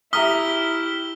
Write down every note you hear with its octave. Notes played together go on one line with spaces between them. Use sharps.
E4 G4 E5 A#5 D#6 F6 B6 G7